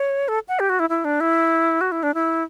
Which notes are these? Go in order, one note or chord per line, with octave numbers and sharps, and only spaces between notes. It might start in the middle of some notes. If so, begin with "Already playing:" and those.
Already playing: C#5
A4
F#5
G4
F#4
E4
E4
D4
E4
F#4
E4
D4
E4